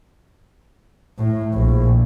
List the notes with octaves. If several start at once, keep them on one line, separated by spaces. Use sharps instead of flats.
A2
A#1